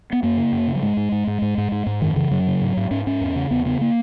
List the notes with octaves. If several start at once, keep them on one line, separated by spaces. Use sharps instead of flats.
B3
F#2 A#3
C#3
F#2
C#3
F#3
G#2 G#3
G#2
G#2
G#2
G#2
G#2
G#2
G#2
F#2 D#3
C#3 E3
F#2 F#3
C#3
G#2
G#2
G#2 C#4
G#2 C#4
E2
C#3
E2 B3
C#3 B3
A#3